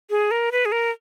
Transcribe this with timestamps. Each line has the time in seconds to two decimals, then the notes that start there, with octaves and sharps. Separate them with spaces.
0.10 G#4
0.31 A#4
0.52 B4
0.65 G#4
0.72 A#4